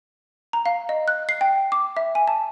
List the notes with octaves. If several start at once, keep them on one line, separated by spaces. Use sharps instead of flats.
A#5
F5
D#5
F#6
C7
G5
D6
E5
G#5
A5